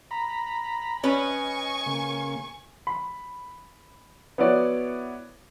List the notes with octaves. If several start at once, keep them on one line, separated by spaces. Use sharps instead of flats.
A#5 B5
C#4 B4 D#5 G#5 C#6
C#3 A#3
B5
B3 E4 F#4 C#5 D5